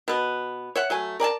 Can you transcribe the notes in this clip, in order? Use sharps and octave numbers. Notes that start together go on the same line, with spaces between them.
B2 B3
C#5 E5 F#5
F#3 A3 G#5
A#4 D5 G#5 A5